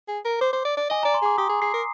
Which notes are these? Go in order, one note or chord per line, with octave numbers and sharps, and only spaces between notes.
G#4
A#4
C5 D6
C5
D5
D5
D#5 G#5
D5 A#5
C6
G#4 D6
G4 D#6
G#4
G#4 C7
A#4